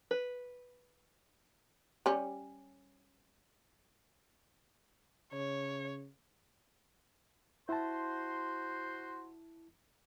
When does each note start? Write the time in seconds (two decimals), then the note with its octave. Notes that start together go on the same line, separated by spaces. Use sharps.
0.11 B4
2.06 G3 C#4
5.33 C#3 C#5
7.69 E4 F#4 C5 A5 C6